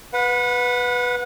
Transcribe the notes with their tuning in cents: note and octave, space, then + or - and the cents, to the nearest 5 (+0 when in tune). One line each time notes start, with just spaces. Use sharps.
B4 +0 F#5 -30